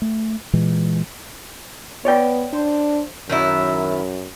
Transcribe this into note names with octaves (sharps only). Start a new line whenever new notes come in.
A3
A#2 E3 G#3
B3 C#5 D5 G5
D4 C5
F#2 D#3 F#3 E4